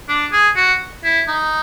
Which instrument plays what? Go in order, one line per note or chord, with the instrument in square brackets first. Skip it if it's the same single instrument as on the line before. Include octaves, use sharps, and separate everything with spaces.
[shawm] D4
G#4
F#4
E4
D#4